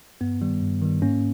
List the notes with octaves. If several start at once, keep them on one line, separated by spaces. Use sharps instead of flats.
G2 B3
D#3 G3
G2
D#3 G3
G#2 A#3 C#4